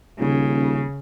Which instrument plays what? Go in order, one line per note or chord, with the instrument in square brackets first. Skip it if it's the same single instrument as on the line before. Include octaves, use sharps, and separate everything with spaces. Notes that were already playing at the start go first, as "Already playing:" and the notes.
[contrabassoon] D#1 [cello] C#3